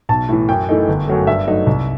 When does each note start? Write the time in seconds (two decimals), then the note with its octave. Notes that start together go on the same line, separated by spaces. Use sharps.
0.09 B1 A5
0.28 A2 E3
0.48 F#2 G5
0.69 E3 A3 D#4
0.88 G1
1.08 F#2 F#3 A3
1.27 G2 E5
1.47 F#3 A3 D#4
1.67 C2